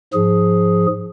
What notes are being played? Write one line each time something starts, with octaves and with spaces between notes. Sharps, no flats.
G#2 F3 G#4